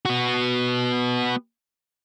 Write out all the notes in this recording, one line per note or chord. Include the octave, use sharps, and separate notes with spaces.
B3 F#4